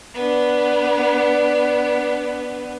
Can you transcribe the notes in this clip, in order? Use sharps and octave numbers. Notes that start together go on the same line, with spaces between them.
B3 D4